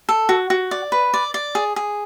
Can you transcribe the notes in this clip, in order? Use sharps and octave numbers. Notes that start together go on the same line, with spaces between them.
A4
F#4
F#4
D5
B4
D5
D5
G#4
G#4